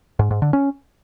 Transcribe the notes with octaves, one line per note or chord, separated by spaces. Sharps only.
G#2
G#2
D3
C#4